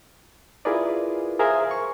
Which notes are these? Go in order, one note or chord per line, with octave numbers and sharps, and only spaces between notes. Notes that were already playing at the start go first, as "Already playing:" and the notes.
E4 F4 G#4 A#4 B4 D5
G#4 A#4 C5 E5 F5 G#5
C#6